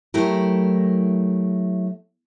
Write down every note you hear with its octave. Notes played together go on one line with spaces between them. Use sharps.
F#3 A3 E4 G4 A#4